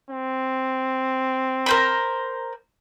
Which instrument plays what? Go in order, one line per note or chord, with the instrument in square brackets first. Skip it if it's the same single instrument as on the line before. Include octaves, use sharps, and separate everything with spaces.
[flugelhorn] C4
[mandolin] A#4 C5 B5